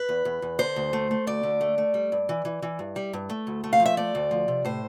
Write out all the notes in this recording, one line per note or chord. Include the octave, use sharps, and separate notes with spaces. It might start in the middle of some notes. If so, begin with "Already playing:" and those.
Already playing: B4
E2
E2
E2
D3 C5
D2
A3
A3
D2 D5
D3
A3
A3
G3
G2
E3
E3
E3
G2
G3
G2
A3
D2
A3
F5
F3
E5
A3 D5
D2
F3
C3
A2 C5